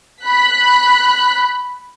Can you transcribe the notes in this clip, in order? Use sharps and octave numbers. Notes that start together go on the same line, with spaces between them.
B5 F#6 B6